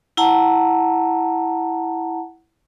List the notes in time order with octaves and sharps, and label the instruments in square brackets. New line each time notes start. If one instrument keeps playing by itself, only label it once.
[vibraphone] E4 F#5 A5 A#5